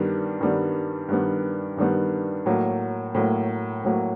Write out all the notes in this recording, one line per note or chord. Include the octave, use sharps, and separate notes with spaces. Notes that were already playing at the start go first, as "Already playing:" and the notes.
Already playing: G2 D#3 G3 B3
G2 D#3 G3 B3
G2 D#3 G3 B3
G2 D#3 G3 B3
A2 F#3 A#3
A2 F#3 A#3
A2 F#3 A#3